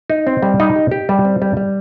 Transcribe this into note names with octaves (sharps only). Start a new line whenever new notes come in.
D#4
C4
G3
D#4
G4
G4
G3
C4
G3
G3